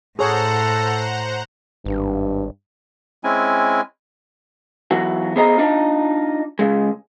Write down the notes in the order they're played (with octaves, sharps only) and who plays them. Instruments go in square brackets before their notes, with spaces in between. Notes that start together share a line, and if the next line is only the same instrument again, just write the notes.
[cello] A2 [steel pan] G#4 C#5 [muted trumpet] A4 [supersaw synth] C5 F#5 A#5
[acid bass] G#1 [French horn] G2
[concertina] G#3 C4 C#4 E4 G#5
[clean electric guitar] E3 F#3 B3 F#4
B3 G#4 C5 D#5 A5 A#5
D4 D#4 F4
C#3 G#3